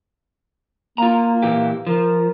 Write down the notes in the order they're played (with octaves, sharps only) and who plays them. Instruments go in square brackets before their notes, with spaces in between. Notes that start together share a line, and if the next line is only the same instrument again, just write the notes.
[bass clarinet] A#3 [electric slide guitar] F4 A#5
[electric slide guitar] A#2 E3 G4
[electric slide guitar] F3 [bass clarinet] A#4